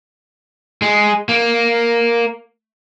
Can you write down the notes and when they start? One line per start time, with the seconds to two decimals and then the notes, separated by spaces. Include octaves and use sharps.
0.82 G#3
1.29 A#3